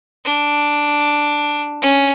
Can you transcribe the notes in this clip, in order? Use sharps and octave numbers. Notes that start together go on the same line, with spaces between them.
D4
C#4